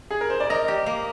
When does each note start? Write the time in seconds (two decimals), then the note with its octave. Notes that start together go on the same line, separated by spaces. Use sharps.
0.11 G#4
0.21 A#4
0.30 C5
0.40 D5
0.50 A#4 D#5
0.68 G4
0.86 A#3